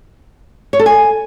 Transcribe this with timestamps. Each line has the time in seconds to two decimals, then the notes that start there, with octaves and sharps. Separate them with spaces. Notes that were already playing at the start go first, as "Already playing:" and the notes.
0.73 C#5
0.79 A4
0.86 G#5